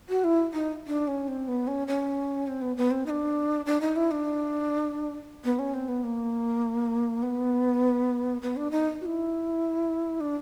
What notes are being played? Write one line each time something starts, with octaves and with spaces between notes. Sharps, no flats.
F#4
E4
D#4
D4
C#4
C4
B3
C#4
C#4
C4
B3
B3
C4
D#4
D4
D4
D#4
E4
D4
B3
C#4
C4
B3
A#3
B3
B3
D4
D#4
F#4
E4
D4